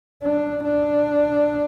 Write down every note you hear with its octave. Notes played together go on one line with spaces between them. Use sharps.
D4
D4